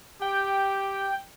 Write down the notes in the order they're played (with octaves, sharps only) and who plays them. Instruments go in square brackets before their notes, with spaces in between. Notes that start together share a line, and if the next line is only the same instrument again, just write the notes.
[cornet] G4 [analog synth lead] G5